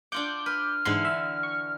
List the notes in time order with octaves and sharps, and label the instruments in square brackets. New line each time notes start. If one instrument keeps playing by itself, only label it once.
[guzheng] D4 F4 F#5 [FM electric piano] D6 G6
[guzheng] B4 [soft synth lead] F6
[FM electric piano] G#2 C6 [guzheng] D3 E3 A4
[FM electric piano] E5
C#6